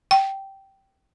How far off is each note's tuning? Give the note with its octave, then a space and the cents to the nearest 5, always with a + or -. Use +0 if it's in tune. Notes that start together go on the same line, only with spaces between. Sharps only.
G5 -10